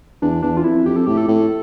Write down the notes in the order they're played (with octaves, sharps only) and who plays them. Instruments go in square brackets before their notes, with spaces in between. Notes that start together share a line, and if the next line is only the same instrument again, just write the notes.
[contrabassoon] E2 [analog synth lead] D4
[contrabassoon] E2 [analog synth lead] D4
[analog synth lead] F4
[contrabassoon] F2 [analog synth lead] E4
[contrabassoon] F2 [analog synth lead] G4
[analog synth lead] A4
[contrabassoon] A2 [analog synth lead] G4
[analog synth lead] A4
[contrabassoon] A2